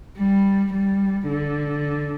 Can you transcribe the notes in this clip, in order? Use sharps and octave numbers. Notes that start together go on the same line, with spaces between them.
G3
G3
D3